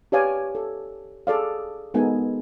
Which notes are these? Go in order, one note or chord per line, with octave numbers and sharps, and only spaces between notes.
G4 B4 C#5 D5 F5 G#5
A4
G#4 A4 D5 F5
G#3 B3 D#4 A4 A#4 G#5